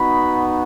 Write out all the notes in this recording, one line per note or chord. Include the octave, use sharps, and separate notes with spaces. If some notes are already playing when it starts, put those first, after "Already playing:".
Already playing: B3 D#4 F#4 B5